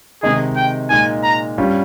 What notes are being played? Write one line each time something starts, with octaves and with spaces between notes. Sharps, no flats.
C3 D#3 G#3 D#4 G#4
G5
A#2 G#3 D#4 G#5
A#5
G2 G3 C#4 F4